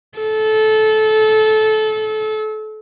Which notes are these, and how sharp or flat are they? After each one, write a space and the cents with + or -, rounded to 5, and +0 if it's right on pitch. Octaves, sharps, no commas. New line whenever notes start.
A4 -20